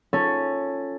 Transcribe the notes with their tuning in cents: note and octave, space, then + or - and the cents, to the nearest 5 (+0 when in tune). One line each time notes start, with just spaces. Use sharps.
C#4 +0 F4 +0 A4 +10